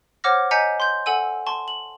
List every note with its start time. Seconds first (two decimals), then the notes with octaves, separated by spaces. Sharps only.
0.24 C5 C#5 F#5 D6 F6 A#6
0.51 D#5 G#5 A#5 G6 B6 C#7
0.80 C6 G6
1.06 A4 F#5 G#5 E6 D#7
1.47 A5 C6 C#6
1.68 F#7